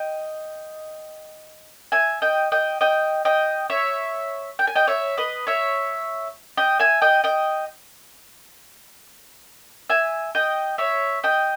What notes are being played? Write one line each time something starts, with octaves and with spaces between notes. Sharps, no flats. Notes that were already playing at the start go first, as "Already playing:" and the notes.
Already playing: D#5 G5
E5 G#5
D#5 G5
D#5 G5
D#5 G5
D#5 G5
C#5 E5
G5
G#5
D#5 G5
C#5 E5
B4 D#5
C#5 E5
D#5 G5
E5 G#5
D#5 G5
D#5 G5
E5 G#5
D#5 G5
C#5 E5
D#5 G5